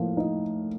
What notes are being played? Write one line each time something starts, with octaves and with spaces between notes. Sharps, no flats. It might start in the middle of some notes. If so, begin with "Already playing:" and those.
Already playing: A2 F3 A#3
D#4